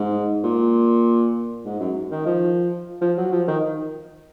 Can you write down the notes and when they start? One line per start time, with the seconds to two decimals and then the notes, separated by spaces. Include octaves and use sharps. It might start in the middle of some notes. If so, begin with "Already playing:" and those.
Already playing: G#2
0.43 A#2
1.65 G#2
1.80 F#2
2.11 D#3
2.26 F3
3.01 F3
3.17 F#3
3.32 F3
3.48 D#3